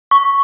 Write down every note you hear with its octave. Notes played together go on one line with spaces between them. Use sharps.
C#6